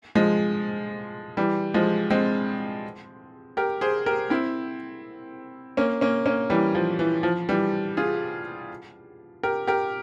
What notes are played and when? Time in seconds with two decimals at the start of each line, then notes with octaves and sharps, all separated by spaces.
0.15 F3 G#3
1.37 E3 G3
1.74 F3 G#3
2.10 G#3 C4
3.57 G4 A#4
3.81 G#4 C5
4.06 G4 A#4
4.30 C4 E4
5.77 A#3 C#4
6.01 A#3 C#4
6.26 A#3 C#4
6.50 E3 G3
6.75 F3
6.99 E3
7.23 F3
7.49 E3 G3
7.97 F4 G#4
9.43 G4 A#4
9.67 G4 A#4